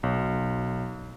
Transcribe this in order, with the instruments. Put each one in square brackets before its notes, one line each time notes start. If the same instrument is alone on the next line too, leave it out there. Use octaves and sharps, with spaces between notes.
[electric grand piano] B1